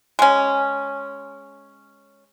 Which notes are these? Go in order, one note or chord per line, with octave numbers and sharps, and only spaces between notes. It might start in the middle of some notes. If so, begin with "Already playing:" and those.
G#3 C#4